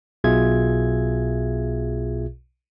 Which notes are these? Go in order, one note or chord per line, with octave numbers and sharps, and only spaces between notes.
B1 B2 F4 G#4 E5 G#6